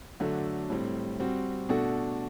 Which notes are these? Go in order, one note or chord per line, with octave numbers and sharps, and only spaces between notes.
D3 F#3 A3 D4 A4
A2 G3 C4
G3 C4 F#4
B2 A3 D4 F#4 A4